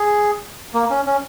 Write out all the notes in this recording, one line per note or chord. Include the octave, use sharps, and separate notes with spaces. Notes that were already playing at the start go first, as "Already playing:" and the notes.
Already playing: G#4
A#3
C#4
C#4